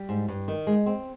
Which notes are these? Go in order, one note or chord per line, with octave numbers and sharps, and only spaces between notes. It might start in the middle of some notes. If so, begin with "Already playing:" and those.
Already playing: G3
G#2
G2
D#3
G#3
C4